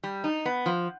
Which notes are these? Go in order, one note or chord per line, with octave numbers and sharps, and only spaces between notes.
G3
D#4
B3
F3